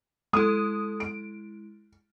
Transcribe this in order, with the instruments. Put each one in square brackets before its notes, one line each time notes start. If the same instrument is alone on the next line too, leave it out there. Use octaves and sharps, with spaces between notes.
[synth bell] G#3 E4 [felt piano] A4 D#6
[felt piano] D7